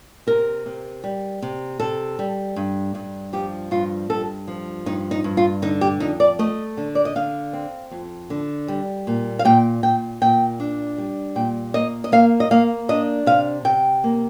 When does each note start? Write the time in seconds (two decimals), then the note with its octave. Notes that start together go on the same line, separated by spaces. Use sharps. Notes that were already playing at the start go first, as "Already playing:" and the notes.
0.27 C3 A#4
0.66 C3
1.04 G3
1.42 C3
1.80 C3 A4
2.19 G3
2.56 G2
2.95 G2
3.33 F3 G4
3.71 G2 F4
4.09 G2 A4
4.48 F3
4.86 G2 D#4
5.11 D#4
5.24 G2
5.37 F4
5.62 D3 D#4
5.81 G4
6.00 F2 D#4
6.20 D5
6.39 A3 D#5
6.77 D3
6.95 D5
7.05 D#5
7.16 D3 F5
7.53 C4
7.91 F2
8.30 D3
8.68 G3
9.07 A#2
9.39 F5
9.45 A#2 G5
9.83 A#2 G5
10.22 A#2 G5
10.60 D4
10.98 G3
11.35 A#2 G5
11.74 A#3 D#5
12.04 D#5
12.12 A#3 F5
12.40 D#5
12.51 A#3 F5
12.89 D4 D#5
13.26 C3 F5
13.65 C3 G5
14.04 A#3